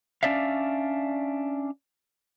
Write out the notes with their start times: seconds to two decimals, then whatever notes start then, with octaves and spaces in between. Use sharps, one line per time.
0.23 C#4 D4 D5 E5 F5